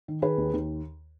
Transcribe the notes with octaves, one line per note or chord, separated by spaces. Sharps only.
D#3
D#3 G#4 B4
D#2
D#2